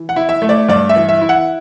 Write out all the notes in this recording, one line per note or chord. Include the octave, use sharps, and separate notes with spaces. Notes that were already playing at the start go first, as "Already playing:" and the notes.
Already playing: E3
F#5
E4
E5
A3
D5
G2 D5
E5
E3
E5
E4
F#5